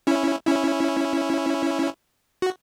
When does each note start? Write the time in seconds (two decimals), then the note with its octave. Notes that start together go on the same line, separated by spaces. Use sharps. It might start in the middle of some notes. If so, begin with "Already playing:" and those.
0.07 C#4 E4
0.47 C#4 E4
2.42 F#4